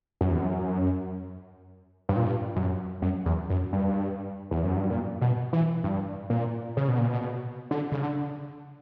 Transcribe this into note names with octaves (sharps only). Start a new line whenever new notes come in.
F#2
E2
F#2
G2
A#2
G2
F#2
F#2
E2
F#2
G2
E2
F#2
G2
A#2
B2
E3
G2
A#2
C#3
B2
A#2
B2
D3
C#3
D3